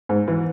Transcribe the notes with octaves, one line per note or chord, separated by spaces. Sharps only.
G#2
E3